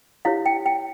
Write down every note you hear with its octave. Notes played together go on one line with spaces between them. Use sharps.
E4 G4 C#5 F5
G5
G5